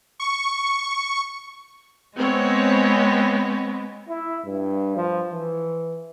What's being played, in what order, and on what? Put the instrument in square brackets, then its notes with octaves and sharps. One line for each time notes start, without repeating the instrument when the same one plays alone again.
[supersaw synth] C#6
[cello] G#3 B3 [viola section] C4 C#5
[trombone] E4
G2
F3
E3